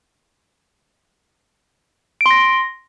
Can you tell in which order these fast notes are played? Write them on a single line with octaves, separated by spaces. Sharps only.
D7 C6 A#6